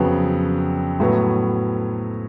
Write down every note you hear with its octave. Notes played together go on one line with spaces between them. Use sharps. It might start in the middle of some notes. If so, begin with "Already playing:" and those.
Already playing: F2 C#3 F#3 B3
A2 F#3 B3